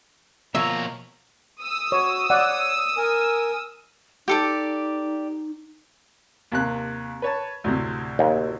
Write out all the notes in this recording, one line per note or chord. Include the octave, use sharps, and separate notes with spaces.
B2 F3 A#3 F4 C#5 E5 A#5
D#6 E6
F#4 C#5
C#5 D5 F#5
A#4 G#5
D#4 G4 A4 D5
D#2 C3 F#6
B4 C#5 A5
D2 A2 C3
D#2